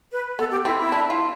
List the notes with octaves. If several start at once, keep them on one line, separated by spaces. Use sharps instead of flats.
B4
B3 A4
G4
C4 E4
E4
D4
F4